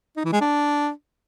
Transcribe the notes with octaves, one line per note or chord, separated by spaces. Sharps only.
D#4
E3
G#3
D4